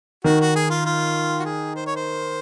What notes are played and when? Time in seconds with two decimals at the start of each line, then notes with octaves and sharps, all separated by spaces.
0.24 D#3 F#4
0.41 F#4
0.56 G#4
0.70 F4
0.85 F4
1.39 F#4
1.45 G#4
1.76 C5
1.86 C#5
1.95 C5